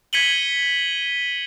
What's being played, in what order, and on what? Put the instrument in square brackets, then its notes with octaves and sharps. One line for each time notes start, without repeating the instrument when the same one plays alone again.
[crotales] G#6 B6 C#7 D#7 F#7 G7